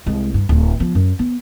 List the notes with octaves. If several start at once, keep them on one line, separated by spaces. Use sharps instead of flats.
C2 G#3
G2
D1
F3 B3
F#2
B3